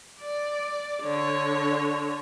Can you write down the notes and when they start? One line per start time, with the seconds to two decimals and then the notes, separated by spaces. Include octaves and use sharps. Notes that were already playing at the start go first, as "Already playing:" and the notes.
0.22 D5
1.03 D3 C#5